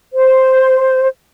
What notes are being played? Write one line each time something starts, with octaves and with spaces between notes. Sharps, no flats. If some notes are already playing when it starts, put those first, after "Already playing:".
C5